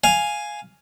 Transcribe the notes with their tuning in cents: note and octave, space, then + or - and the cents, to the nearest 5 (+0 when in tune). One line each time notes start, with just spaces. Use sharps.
F5 +0 G#5 +0